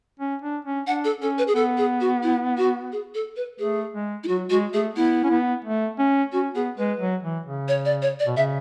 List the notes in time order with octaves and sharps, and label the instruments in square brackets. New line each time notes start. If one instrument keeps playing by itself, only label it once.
[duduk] C#4
D4
C#4
[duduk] D4 [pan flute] F#5
[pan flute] A4
[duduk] C#4 [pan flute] A4
[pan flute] B4
G#4
[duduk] B3 [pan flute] A4
[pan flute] G#4
F#4
E4
F#4
G#4
A4
B4
[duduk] A3 [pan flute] G#4
[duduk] G#3
[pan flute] E4
[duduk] F#3 [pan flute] F#4
[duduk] G#3 [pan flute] F#4
[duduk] A3 [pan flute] G#4
[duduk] B3 [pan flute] E4
[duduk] C#4
B3
A3
C#4
[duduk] C#4 [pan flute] F#4
[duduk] B3 [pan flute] G#4
[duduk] G#3 [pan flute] B4
[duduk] F#3
E3
C#3
[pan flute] C#5
D5
C#5
D5
[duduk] B2
[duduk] C#3 [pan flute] E5